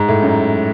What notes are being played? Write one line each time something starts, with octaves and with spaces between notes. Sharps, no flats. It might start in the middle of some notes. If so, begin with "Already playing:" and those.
Already playing: G#2
A2
F#2